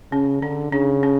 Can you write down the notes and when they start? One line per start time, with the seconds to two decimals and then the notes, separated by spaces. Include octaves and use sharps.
0.12 C#3 C#4
0.42 D3 D4
0.72 C#3 D4
1.03 C#4